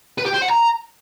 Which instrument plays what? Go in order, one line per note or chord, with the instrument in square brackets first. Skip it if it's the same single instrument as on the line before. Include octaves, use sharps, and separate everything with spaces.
[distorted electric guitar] B4
G4
C5
F#5
A#5